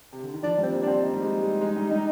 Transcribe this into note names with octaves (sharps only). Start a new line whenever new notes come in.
C3
D3
D#3
F3 D4
G3 C4
A#3
C4 D4
D#4
G3
G#3
G#3
G#3
G3
G3